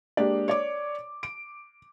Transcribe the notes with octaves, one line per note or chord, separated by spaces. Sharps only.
G#3 A#3 D4 G4 D5
C#5 D5 D6
D7